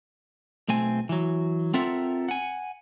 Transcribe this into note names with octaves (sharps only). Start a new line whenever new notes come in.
B1 A3 C4 G#5
E3 F#3
C4 F4 A4 A#4 E5 F#5
F#5 G#5